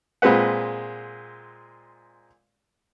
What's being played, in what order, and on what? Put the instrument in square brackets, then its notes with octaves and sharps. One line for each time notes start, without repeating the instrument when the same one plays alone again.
[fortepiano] A#2 G#3 C4 B4 F#5